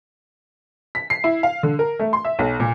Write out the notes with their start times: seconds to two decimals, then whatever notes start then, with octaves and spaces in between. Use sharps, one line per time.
0.95 B6
1.10 C7
1.24 E4
1.43 F5
1.63 D3
1.79 A#4
1.99 A3
2.13 C6
2.25 E5
2.39 B1
2.60 A#2